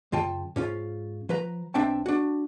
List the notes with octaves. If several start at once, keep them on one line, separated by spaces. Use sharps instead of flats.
F#2 C#3 F4 G5 A5
G#2 C#4 F4
F3 B4 A#5
B1 C4 D4 E5 G5 A5
D4 F#4